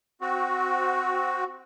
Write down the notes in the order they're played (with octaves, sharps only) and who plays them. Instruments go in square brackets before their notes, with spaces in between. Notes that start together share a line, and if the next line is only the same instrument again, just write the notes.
[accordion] C4 F#4